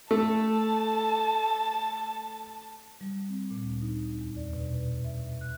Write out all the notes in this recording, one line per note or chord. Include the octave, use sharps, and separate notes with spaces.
A3 A5
G3
C4
A#2
D2
D#4
E2
D5
B2
B4
E5
F#6